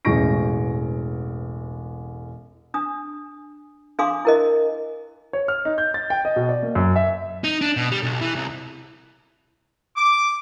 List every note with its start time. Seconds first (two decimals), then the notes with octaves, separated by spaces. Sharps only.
0.05 E1 A1 G#3 C#6 A#6 D7
2.74 D4 D#6
3.99 D4 G#4 F5 C6 D6 D#6
4.25 E4 A#4 D#5
5.33 C#5
5.48 F6
5.65 D#4
5.78 G6
5.94 A6
6.10 G5
6.25 D#5
6.36 B2
6.49 D5
6.63 A#3
6.75 F#2
6.96 E5
7.44 D#4
7.61 D4
7.77 B2
7.92 G3
8.03 B1
8.21 E3
8.36 C2
9.95 D6